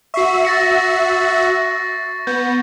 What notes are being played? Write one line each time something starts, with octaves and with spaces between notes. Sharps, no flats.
F#4 E5 C#6 C7
A6 A#6 C#7
B3 G6